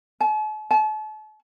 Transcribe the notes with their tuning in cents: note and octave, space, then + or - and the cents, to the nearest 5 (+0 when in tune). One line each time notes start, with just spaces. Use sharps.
A5 -45
A5 -40